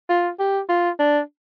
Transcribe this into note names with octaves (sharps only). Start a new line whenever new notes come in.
F4
G4
F4
D4